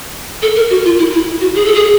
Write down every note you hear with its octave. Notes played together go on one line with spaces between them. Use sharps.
A4
A#4
F#4
F4
E4
E4
F#4
G#4
A4
G#4